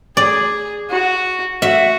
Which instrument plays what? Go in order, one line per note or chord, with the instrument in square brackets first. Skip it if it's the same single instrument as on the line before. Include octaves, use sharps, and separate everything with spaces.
[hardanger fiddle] G#4 [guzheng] D5
[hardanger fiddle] F#4
[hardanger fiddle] F#4 [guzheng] E5